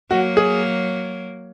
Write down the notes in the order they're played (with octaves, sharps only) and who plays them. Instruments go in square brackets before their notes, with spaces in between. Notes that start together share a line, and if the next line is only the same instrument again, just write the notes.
[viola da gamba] F#3 A#3 [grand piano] F#4
[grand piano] G#4